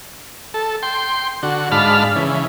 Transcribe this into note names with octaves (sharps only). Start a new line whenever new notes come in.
A4
G5 C6
D3 F#4
G#2 D4 F5 A5 B5 F6
C#3 E3